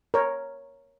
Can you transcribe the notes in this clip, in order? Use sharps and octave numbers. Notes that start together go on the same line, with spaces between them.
A#4 C#5